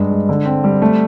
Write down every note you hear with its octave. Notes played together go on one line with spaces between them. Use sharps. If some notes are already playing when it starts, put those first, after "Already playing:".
Already playing: G2 G#3
G#3
D3
C4
G3
A3